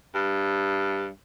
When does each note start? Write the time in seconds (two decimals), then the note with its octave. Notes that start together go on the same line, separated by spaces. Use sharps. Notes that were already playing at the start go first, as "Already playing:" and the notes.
0.15 G2